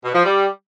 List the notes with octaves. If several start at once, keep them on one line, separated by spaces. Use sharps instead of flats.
B2
F3
G3